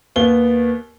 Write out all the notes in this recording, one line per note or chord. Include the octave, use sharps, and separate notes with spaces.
D#2 B3 G7